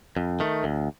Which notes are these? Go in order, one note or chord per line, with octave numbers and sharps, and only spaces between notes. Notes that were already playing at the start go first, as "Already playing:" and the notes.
F2
D#3 A3
D2